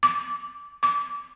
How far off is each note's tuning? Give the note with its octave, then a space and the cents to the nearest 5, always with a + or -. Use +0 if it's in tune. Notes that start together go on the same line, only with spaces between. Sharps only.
D6 -20
D6 -25